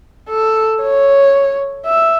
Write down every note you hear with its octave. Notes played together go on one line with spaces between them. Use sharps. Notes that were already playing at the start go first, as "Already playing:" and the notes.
A4
C#5
E5